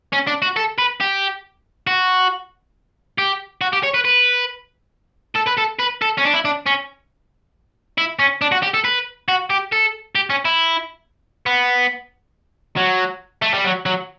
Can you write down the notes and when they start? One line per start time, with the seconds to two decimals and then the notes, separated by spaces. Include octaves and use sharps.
0.13 C#4
0.27 D4
0.42 F#4
0.56 A4
0.78 B4
1.00 G4
1.87 F#4
3.18 G4
3.61 F#4
3.73 G4
3.83 C#5
3.94 B4
4.05 B4
5.36 A4
5.47 B4
5.58 A4
5.80 B4
6.02 A4
6.18 C#4
6.25 D4
6.33 E4
6.45 D4
6.67 C#4
7.98 E4
8.19 C#4
8.42 D4
8.52 F#4
8.63 G4
8.74 A4
8.84 B4
9.28 F#4
9.50 G4
9.72 A4
10.15 G4
10.30 C#4
10.45 E4
11.46 B3
12.77 F#3
13.42 A3
13.54 G3
13.64 F#3
13.86 F#3